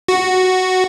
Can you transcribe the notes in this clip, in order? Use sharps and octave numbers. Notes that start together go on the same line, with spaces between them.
F#4